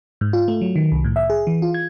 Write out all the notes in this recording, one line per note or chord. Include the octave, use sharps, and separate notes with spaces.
G#2
F4
A3
F#3
D#3
C2
A2
E5
G#4
E3
F4
G#6